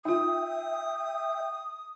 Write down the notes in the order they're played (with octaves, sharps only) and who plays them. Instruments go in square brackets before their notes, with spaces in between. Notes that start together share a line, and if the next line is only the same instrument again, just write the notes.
[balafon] D#4 F4 [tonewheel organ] E5 G5 [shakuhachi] D#6